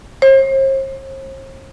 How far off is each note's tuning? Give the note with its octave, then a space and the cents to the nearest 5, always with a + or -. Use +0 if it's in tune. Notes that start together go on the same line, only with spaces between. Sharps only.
C5 +45